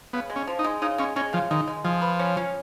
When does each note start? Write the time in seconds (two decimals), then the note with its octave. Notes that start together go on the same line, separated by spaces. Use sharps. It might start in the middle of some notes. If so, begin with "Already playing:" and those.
0.13 C#3 B3
0.30 G#3
0.36 C#4
0.47 F3
0.59 D#4
0.64 G#3
0.82 C#3 D#4
0.98 G#3 C#4
1.16 G#3 C#4
1.33 C#3 F3
1.51 D#3 G#3
1.67 G#3
1.84 F3 G#4
2.02 B4
2.19 C#4
2.37 C#4